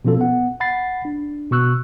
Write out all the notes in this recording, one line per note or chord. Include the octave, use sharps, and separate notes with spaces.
B2 F3 C#4 F4 A4
B3 F#5
F#5 B5 A6 C7
D4
B2 C#6 E6 F#6